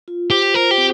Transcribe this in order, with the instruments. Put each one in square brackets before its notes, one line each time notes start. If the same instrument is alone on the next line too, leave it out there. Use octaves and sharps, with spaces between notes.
[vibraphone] F4
[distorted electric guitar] G4 [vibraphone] C5
[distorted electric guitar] A#4 [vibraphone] C5
[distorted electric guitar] G4
[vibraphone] C4